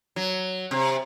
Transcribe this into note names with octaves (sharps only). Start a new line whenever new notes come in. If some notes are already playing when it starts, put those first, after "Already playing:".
F#3
C3